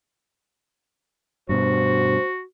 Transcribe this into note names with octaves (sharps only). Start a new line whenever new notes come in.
G2 B2 F#4 C5